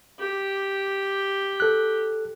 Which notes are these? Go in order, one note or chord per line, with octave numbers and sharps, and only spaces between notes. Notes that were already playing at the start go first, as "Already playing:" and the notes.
G4
A4 F#6